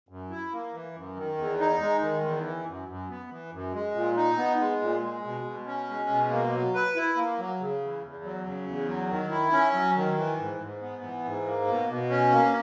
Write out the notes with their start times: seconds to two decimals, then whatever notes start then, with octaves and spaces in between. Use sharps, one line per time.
0.09 F#2
0.30 E4
0.53 A#3
0.73 E3
0.95 F#2
1.16 D#3
1.37 E2
1.59 D#4
1.81 G#3
2.02 D#3
2.23 E2
2.44 E3
2.67 F#2
2.88 F#2
3.10 B3
3.30 E3
3.52 F#2
3.73 G#3
3.94 A#2
4.16 D#4
4.37 B3
4.60 G#3
4.81 A#2
5.02 G#3
5.24 B2
5.45 B2
5.66 C#4
5.89 G#3
6.09 B2
6.31 A#3
6.52 F#3
6.74 B4
6.96 E4
7.16 A#3
7.38 F#3
7.60 C#3
7.81 E2
8.03 E2
8.24 F#3
8.45 C#3
8.67 E2
8.88 F#3
9.09 D#3
9.31 E4
9.52 C#4
9.74 F#3
9.96 D#3
10.17 E3
10.39 G#2
10.60 G#2
10.81 B3
11.03 E3
11.24 G#2
11.46 A#3
11.67 B2
11.89 B2
12.10 C#4
12.32 A#3